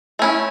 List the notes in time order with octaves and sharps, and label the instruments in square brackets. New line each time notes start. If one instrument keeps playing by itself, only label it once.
[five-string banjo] A3 C#4 E4